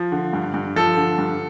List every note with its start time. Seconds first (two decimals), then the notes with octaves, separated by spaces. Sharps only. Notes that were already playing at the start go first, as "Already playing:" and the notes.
Already playing: F3
0.12 D3
0.33 G2
0.54 G2
0.76 F3 A4
0.97 D3
1.18 G2